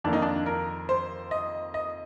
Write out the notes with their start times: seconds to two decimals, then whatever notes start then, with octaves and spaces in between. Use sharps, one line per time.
0.04 F2 D#3 A#3 D4
0.13 D#4
0.22 D4
0.46 A#4
0.89 C5
1.31 D#5
1.74 D#5